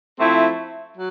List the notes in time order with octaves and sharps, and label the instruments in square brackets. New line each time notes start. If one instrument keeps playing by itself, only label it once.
[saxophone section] F3 A3 C4 E4
F#3